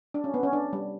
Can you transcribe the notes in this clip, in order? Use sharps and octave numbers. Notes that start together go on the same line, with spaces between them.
D4
C#4
B3
C#4
D4
G3